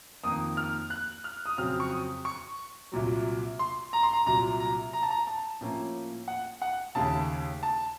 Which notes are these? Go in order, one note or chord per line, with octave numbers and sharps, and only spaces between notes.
F2 D#3 A#3 D#6
F6
F#6
F6
D#6
F2 C#3 F#3 C4 F6
C#6
D#6
C#6
C2 A#2 F#3
C6
A#5
C6
A#5
C2 A#2 F#3 A#5
A#5
A#5
A5
A#5
A5
A2 F3 A#3 C#4
F#5
F#5
D#2 C#3 A3 A5
A5